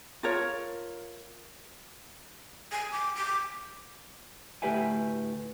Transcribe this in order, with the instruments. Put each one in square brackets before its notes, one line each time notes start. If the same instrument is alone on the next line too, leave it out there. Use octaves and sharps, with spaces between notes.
[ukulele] F4 A#4 C#5
[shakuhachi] G#5
D6
D6
[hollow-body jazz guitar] D2 A2 G4 B4 E5 G#5